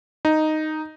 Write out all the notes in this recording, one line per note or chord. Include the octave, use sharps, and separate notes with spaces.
D#4